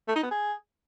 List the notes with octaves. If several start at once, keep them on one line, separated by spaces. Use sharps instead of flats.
A3
D#4
B3
G#4